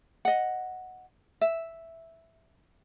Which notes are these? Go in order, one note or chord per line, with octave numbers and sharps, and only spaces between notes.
D#5 F#5
E5